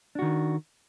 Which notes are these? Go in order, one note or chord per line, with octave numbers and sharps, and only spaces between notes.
D#3 D4 F#4